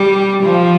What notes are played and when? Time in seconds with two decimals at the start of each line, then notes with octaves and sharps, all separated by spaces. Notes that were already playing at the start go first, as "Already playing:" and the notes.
Already playing: G3
0.43 F3